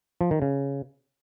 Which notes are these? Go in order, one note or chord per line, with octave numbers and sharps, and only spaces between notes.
F3
D#3
C#3